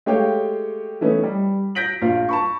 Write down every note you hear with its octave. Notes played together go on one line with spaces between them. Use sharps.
G#3 A3 G4 C#5 F5 G5
E3 A3 B3 C#4 D#4
G3
G6 A#6 B6 D7 F#7
A#1 F4 F5
A5 B5 C#6